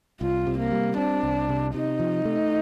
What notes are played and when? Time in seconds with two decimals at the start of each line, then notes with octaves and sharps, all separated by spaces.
0.21 C2 F4
0.47 C3
0.59 A#3
0.72 G3
0.98 C4 D4
1.23 C2
1.49 C3
1.74 C3 D#4
2.00 F3
2.25 A3